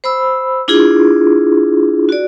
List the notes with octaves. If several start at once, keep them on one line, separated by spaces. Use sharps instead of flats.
C5 B5 E6
D4 E4 F4 G#4
F#4 D5